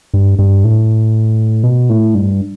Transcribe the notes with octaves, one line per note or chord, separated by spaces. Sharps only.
G2
G2
A2
B2
A2
G2